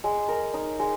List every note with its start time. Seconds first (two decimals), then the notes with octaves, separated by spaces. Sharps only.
0.04 G#3
0.28 A#4
0.54 D#4
0.79 G#3